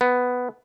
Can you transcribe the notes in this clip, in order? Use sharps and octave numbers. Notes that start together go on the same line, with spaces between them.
B3